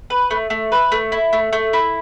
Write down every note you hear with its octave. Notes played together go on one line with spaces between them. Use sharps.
B4
A3
A3
B4
A3
E4
A3
A3
E4